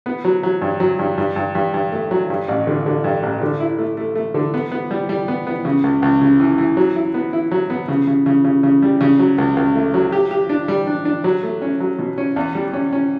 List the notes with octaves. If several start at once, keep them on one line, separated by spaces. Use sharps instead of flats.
B3
F#3
F#3
G2
F#3
G2
G2
G2
G2
G2
A3
F#3
G2
A1
D3
D3
G2
A1
D3
E4
A3
A3
A3
D3
B3
B3
G3
G3
B3
B3
C#3
C#2
C#2
C#3
E3
E3
F#3
E4
B3
E4
F#3
B3
C#3
C#3
C#3
C#3
C#3
G3
C#3
F#3
C#2
C#2
A3
F#3
G4
G4
D4
G3
D4
D4
F#3
A3
C#4
F#3
B2
C#4
E2
G3
C#4
C#4